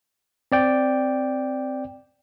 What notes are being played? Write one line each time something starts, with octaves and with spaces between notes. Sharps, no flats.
C4 D5 G5